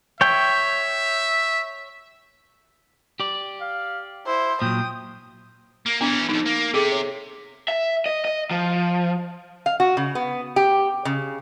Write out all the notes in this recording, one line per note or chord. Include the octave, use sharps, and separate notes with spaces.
C#5 E5 G5
G4 D5
F5
E4 C5
A#2 F#3 G5 D#6
A#3
E3 B3 C#4 D4
C2 F2 D#4
A#3
C3 G#4 A4 D6
C#5
E5
D#5
D#5
F3
F5
F#4
C#3
B3
G4
C#3